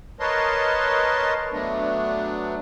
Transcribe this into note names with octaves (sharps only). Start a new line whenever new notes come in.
A#4 B4 C#5 D#5 A5 C6
F#3 A3 B3 D4